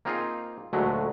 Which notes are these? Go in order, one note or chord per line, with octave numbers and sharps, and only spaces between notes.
A#3 C4 D#4 F4 G#4
D2 A#2 F#3 G#3 A3